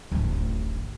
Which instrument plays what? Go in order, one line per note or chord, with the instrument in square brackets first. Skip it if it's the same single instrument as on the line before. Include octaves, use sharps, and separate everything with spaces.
[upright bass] D1 A1